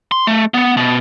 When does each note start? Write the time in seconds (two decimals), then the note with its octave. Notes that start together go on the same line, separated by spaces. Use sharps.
0.12 C6
0.27 A3
0.54 B3
0.77 B2